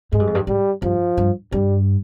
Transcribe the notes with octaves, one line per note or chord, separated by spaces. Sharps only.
G#2 G#3
G2
F2
G2
G#2 G3
G2 F3
G2
G2 G3